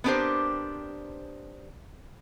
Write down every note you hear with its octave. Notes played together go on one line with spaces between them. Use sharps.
B3 C4 D4 G4 A#4 C5